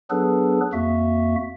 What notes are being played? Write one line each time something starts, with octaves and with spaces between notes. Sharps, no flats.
F#3 B3 D4 G#4 A4 B4
F2 A#3 F#4 E5